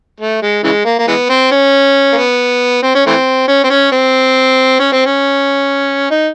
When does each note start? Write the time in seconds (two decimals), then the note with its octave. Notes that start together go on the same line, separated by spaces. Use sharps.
0.20 A3
0.42 G#3
0.64 C#3 E3 G#3
0.85 A#3
0.99 A#3
1.08 E3 G#3 B3
1.30 C4
1.52 C#4
2.13 A#3
2.17 B3
2.83 C4
2.95 C#4
3.06 E3 A3 C4
3.48 C#4
3.64 C4
3.70 C#4
3.92 C4
4.80 C#4
4.92 C4
5.06 C#4
6.11 D#4